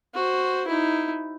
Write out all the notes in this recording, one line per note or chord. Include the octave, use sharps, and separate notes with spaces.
F#4 C5
D#4 E4